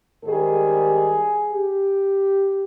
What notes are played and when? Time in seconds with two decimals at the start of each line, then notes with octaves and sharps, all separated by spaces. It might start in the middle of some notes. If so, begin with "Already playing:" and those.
0.23 G#2 D#3 G3 G#4
1.53 G4